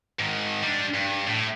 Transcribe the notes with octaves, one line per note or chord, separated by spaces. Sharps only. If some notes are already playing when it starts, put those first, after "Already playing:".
G#2 D#3
G3 D4
G2
A2